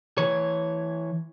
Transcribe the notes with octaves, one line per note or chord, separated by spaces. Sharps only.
E3 C#5